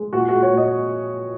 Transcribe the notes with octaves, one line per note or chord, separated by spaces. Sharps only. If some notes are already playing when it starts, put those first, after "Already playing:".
Already playing: G#3
A#2 F#4
F#4
G#3
C#5
A#2
D#5